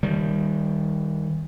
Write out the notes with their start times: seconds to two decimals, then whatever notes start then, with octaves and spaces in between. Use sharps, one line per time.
0.03 D#3 G3